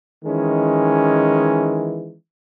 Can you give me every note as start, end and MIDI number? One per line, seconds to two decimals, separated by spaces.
0.25 2.14 51
0.25 2.14 52
0.25 2.14 56
0.25 2.14 61